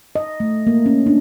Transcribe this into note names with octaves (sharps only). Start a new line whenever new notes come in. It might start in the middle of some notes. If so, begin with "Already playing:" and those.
D#5
A3
A#3
C#4
D4